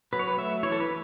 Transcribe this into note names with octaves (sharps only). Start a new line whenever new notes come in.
F#3 B4
C#5
B4
A3 E5
E3 C#5
A4
B4